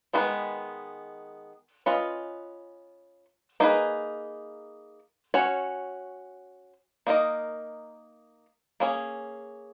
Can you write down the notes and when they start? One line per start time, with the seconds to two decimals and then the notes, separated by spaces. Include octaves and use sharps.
0.13 D#3 G#3 B3 F#4 B4
1.86 C#4 F4 B4 D#5
3.60 A#3 D#4 G#4 B4
5.34 C#4 F#4 C#5
7.07 A#3 D#4 A#4 D#5
8.80 A#3 C#4 G#4